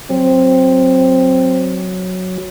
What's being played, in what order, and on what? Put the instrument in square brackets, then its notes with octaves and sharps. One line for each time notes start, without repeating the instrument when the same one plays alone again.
[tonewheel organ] F#3 [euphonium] C4